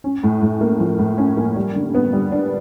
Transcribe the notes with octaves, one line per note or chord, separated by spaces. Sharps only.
C#4
A2
A2
A#3
F3
A2
C#4
A#3
G3
D3
B3
G3
D4